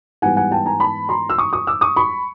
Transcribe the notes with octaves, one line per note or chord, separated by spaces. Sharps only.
G#2 E3 G3 B3 F#5 G#5
F#5 G#5
G5 A5
G#5 A#5
A5 B5
A#5 C6
E6
C#6 D#6
C#6 D#6
D6 E6
C#6 D#6
B5 C#6